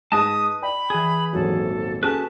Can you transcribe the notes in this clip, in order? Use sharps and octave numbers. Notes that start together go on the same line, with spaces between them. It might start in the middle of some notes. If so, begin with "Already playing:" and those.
G#2 G#4 B4 D#5 A5 D#6
D5 G5 B5
E3 G#4
D#1 G#1 F#3 A4
C#4 F#4 G#4 A4 B4 A5